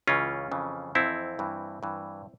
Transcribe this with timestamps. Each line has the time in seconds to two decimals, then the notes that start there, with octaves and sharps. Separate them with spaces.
0.07 C#2 C#3 E3 C#4 F4
0.51 F2 C#3 E3
0.95 F2 E3 C4 E4
1.39 G2 E3
1.83 G2 E3